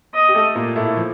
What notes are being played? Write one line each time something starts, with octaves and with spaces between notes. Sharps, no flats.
D#5
G4
A3 A4
A#2 A#3
A2 A3
F3